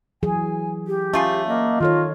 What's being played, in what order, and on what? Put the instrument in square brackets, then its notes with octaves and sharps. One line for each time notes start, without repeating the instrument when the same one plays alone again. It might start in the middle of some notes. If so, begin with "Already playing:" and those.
[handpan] E3 F#3 G#4 [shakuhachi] G#5
[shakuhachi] G4
[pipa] A3 F4 G#4 [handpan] C#4
[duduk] A#3 [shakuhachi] D#5
[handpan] D#3 A4 C#5 [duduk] F4